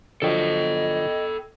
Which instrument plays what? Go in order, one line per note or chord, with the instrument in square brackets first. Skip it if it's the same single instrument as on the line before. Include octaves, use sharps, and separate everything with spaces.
[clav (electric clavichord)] D3 F3 F#3 [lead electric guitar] A4 G5 [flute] D#5